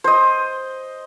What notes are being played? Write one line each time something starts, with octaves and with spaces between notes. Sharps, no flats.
C5 D#5